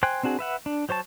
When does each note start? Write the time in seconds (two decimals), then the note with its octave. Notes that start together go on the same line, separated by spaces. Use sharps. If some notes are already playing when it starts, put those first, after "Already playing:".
0.03 C5 G5 G#5 F#6
0.23 C4 D4 F#4 G#4
0.39 B4 E5 F#5
0.66 D4
0.89 F#3 C5 C#5 A5